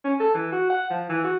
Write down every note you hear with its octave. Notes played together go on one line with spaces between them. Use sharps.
C#4
A4
E3
F#4
F#5
F3
E3
F#4